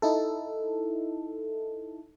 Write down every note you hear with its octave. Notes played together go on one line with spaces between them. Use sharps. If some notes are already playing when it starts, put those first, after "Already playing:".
D#4 E4 A4